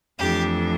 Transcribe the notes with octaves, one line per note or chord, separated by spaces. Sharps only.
F2 E3 A3 D4 G4